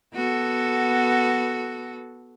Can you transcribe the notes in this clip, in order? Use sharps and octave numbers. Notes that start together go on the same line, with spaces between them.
B3 F#4 A4